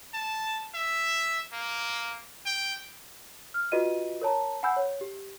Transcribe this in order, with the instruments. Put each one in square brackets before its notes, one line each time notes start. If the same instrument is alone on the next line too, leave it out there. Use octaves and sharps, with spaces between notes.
[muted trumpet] A5
E5
A#3
G5
[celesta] F6
F4 F#4 B4 D5 D#5 D#7
A#4 C#5 A5 A#5
F#5 G#5 B5 E6 G6
C#5
G4